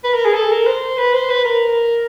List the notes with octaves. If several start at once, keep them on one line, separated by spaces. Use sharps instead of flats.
B4
A#4
G#4
A4
A#4
C5
B4
C5
B4
A#4